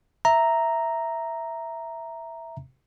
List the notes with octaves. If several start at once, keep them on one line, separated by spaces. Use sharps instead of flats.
E5 A#5